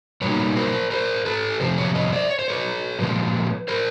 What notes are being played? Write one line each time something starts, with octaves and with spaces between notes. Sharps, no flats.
B2 G3 A#3 D#4 B4 C#5
A#4 C5
A#4 C5
A4 B4
F2 C3 F3 C5
B4 C#5
C#5 D#5
C5 D5
C#5
C5
B4 C#5
A#2 F3 G#3
A#4 C5